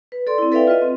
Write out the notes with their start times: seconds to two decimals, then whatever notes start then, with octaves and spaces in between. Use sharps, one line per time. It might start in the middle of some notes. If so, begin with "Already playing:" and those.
0.12 B4
0.27 A4 D5 C6
0.38 C4 E4
0.52 A4 B4 D5 E5 F5 G5
0.67 F4 B4 D#5
0.82 C4